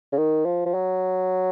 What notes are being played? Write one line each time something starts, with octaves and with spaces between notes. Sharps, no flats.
C#3
D#3
F3
F3
F#3